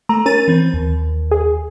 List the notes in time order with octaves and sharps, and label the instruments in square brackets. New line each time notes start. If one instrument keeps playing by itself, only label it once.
[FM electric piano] A3 [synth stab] A#5
[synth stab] C#4 A6 D#7 [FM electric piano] A#4
[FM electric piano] E3 C4
D#2
[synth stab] G#4